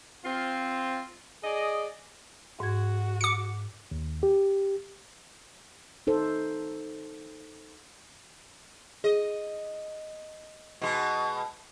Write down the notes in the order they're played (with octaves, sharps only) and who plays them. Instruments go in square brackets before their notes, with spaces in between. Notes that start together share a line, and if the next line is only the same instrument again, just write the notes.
[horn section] C4 F4
G#4 D5 D#5
[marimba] G#2 G#6 [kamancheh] F#4
[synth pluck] D6 C#7
[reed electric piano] D#2
G4
[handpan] D#4 A4 C5
[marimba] G#4 [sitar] D#5
[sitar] B2 G#3